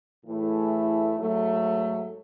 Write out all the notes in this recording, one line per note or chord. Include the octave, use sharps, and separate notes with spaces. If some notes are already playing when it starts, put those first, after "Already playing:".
A2 E3 A3 E4 G#4
G#2 F#3 A3